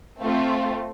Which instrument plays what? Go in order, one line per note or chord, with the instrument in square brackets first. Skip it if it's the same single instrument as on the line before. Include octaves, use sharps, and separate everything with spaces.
[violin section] A3 C4 F4